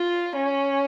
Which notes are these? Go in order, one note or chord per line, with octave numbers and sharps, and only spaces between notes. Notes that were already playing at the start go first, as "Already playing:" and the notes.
Already playing: F4
C#4